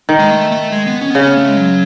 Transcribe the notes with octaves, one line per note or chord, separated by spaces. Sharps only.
D#3
G#3
A3
A3
G#3
B3
C#4
B3
C#3 C#4
B3
A3
G#3
F#3